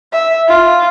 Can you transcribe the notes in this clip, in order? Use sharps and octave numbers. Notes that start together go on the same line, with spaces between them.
E5
F4